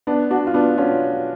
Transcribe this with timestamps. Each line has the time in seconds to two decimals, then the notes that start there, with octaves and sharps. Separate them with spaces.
0.07 B3 D4
0.31 D4 F#4
0.47 F4
0.54 B3 D4
0.78 C#4 F4